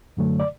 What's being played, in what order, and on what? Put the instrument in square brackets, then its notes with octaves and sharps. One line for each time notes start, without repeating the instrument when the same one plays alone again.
[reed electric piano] F#2 D3 F#3 A3
D5